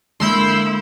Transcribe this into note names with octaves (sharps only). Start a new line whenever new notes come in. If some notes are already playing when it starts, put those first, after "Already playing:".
D3 G#3 A#3 E4 C6 E6 G6